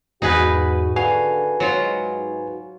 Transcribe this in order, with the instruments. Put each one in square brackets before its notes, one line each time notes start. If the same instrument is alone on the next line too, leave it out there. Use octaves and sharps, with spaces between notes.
[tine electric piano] E2 G#2 [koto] D#4 G#4 B4 [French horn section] F#4
[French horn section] D3 [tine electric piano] F#4 B4 G#5 [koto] F5
[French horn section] G#2 D#4 [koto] F#3 F4